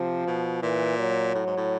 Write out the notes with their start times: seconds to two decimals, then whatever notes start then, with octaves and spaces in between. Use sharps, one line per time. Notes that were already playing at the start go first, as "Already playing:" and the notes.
Already playing: C3 F3
0.27 B2
0.62 A#2 E3
0.99 F#3
1.35 A2
1.47 G#2
1.57 A2